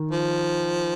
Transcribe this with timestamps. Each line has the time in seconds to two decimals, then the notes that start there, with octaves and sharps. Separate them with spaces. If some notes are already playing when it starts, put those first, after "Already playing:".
Already playing: D#3
0.11 F3